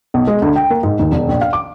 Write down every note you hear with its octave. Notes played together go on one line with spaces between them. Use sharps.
B1
G#3
D2
G5
A#3
G#2
D#2
E1
A#1
F5
D6